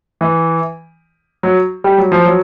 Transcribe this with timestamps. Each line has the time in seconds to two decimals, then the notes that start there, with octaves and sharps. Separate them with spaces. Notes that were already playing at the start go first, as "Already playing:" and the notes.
0.21 E3
1.43 F#3
1.84 G3
1.98 F#3
2.12 F3
2.25 F#3